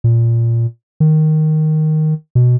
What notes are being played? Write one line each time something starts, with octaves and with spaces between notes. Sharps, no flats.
A#2
D#3
B2